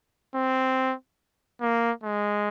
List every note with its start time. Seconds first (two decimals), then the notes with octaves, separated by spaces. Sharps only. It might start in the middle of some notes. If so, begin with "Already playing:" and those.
0.35 C4
1.61 A#3
2.03 G#3